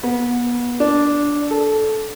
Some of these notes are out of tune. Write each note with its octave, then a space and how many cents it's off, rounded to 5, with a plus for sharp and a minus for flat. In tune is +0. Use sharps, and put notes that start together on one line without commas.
B3 -30
D4 -10
A4 -15